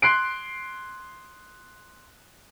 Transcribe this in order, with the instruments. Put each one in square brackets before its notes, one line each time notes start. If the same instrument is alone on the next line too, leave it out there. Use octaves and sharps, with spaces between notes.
[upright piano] C6 F#6 C7 D7